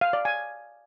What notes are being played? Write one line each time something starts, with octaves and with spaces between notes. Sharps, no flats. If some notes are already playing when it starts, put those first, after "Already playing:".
F5
D5
G#5